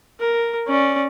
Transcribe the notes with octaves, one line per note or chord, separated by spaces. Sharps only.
A#4
C#4 D5